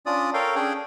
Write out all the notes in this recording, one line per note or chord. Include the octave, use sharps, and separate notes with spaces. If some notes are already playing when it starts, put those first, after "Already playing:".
C#4 D4 F4 D5 D#6
A4 A#4 C#5 F5 G5
C#4 D4 G#4 G5